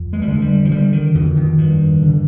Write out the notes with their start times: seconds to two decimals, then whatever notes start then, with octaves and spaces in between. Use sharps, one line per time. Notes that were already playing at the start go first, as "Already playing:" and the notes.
Already playing: F2
0.13 G#3
0.22 G3
0.28 D3 G#3
0.42 G3
0.65 F3
0.71 D3 G3
0.92 D#3
1.15 F2 D3
1.36 D#3
1.58 G2
2.02 D3